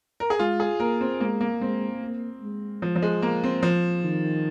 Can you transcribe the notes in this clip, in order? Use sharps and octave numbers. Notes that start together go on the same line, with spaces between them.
A#4
G#4
G#3 F4
G#4
A#3 A#4
C4
G#3 A#3
A#3
G#3 C4
A#3
G#3
F3
F3
G#3
A#3
C4
F3
D#3